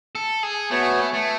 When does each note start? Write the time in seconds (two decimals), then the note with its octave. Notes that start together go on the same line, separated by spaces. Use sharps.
0.15 A4
0.43 G#4
0.71 A3 B3 F#4 C#5 G#5
1.13 A3